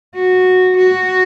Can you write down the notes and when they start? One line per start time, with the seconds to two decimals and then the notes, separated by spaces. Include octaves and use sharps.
0.15 F#4
0.77 F#4